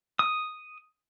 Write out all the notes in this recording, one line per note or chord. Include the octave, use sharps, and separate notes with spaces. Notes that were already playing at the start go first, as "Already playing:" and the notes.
D#6